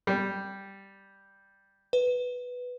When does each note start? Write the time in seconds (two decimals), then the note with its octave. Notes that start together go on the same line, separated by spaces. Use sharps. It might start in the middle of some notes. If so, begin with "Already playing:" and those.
0.07 G3
1.93 B4